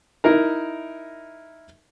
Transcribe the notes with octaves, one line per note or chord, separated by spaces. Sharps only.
D#4 E4 A#4 A#5